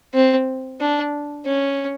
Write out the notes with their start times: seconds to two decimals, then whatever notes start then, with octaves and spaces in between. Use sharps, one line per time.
0.14 C4
0.80 D4
1.46 C#4